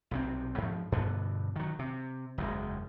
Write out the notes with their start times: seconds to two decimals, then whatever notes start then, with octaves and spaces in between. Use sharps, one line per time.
0.11 B1 C3 C4
0.58 G#2 F3
0.92 G2 B2 D3 B3
1.56 D#3 F#3
1.79 C3
2.38 F#1 E2 C#3 G#3